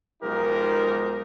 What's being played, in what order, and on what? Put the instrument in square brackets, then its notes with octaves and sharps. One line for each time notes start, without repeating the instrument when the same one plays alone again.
[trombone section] B1 F3 G#3 D#4 G4 A#4